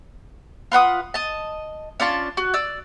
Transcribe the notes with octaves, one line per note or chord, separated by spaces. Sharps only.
F4 B4 F#5 D#6
D#5 A5
C#4 D4 F4 A5
F#4
D5 E6